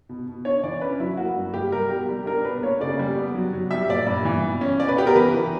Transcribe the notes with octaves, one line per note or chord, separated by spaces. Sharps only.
B2
B2
D4 C#5
E3 D5
C#4 B4
F#3 E4
A#3 F#4
G2
G3 G4
G3 A#4
B2 G4
G3
D4 A#4
B2 B4
A#3 C#5
C#3 D5
G3
B3
F#3
F#3
G3 E5
A#2 D5
G2
E3
B2
C#4
B2 D5
B4
B3 G4
A#4
E3 B4
E3